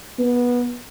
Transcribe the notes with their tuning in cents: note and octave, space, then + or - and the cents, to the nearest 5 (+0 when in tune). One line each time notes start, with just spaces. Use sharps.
B3 -20